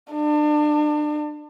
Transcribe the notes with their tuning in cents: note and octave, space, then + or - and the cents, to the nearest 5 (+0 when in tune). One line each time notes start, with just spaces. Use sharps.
D4 +35